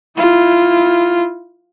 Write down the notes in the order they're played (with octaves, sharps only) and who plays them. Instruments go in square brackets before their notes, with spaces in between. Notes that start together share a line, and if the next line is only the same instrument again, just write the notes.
[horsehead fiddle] E4 F4